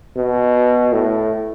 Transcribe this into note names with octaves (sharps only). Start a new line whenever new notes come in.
B2
A2